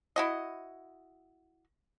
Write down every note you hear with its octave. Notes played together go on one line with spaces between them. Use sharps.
E4 F#4 D#5